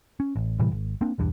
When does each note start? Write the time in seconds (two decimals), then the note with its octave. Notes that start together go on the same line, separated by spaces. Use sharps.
0.20 C#4
0.36 A1
0.59 A2 C3 E3 G3
0.71 G#1
1.01 A#3 C4 D4
1.18 B1 E2 G2